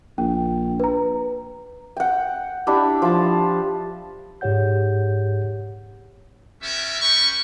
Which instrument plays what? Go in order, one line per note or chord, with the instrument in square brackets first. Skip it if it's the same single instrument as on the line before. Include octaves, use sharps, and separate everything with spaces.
[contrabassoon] A#1 [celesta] G5
[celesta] B4 A#5
[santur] F#5 G5
D4 E4 G4
F3 A5
[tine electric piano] G#2 G4 G#4 C#5 F#5 G6
[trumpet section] B3 C#4 G4 A#4 E5
G3 C#4 B4 G5 B5 C#6